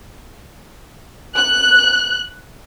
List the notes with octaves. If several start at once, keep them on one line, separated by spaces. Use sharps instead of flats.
F#6